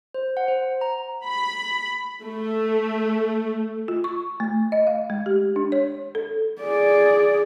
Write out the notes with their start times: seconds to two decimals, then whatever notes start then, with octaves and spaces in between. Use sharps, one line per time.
0.14 C5
0.37 F#5
0.48 C5
0.81 A#5
1.25 B5
2.23 A3
3.88 F4
4.04 C#6
4.40 A3
4.72 D#5
4.87 F5
5.10 G#3
5.26 G4
5.56 D4
5.72 C#5
6.15 A4
6.62 G#4 D5